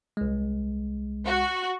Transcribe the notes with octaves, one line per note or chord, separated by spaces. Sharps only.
C2 G#3
F#4